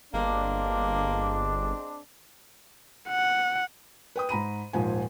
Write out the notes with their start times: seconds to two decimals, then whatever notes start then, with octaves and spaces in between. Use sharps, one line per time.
0.14 G1 G#3 A#3 C4 D4
3.09 F#5
4.16 B4 G5 D#6
4.29 G#2 A#5 B5 D#7
4.73 D#1 G#2 F3 G#5